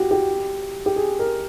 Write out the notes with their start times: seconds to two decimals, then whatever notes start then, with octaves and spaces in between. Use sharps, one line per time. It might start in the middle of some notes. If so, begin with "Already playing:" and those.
Already playing: F#4 G4
0.11 G4
0.86 G4
0.96 G#4
1.19 A#4